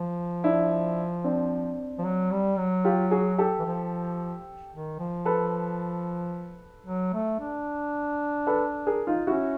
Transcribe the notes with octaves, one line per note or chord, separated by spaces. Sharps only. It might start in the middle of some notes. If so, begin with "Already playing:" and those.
Already playing: F3
D4 E4
C4 D4
F3
F#3
G3
F#3
F4 G4
F#4 G#4
G4 A4
E3
F3
D#3
F3
A4 B4
F#3
A3
D4
A4 B4
G#4 A#4
D#4 F4
C#4 E4 F#4